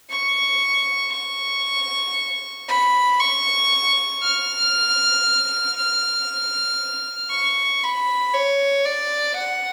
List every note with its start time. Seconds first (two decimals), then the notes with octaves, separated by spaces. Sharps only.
0.11 C#6
1.13 C#6
2.68 B5
3.20 C#6
4.23 F6
5.77 F6
7.31 C#6
7.83 B5
8.34 C#5
8.85 D5
9.37 F#5